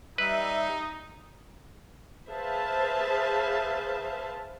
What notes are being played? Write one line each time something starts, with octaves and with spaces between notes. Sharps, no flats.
G3 D#4 B4 E5
G#4 B4 C5 E5 F5 A5